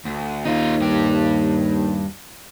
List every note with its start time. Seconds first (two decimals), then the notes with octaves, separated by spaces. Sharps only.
0.06 D2
0.45 D#2 D#4 F4
0.81 G2 G4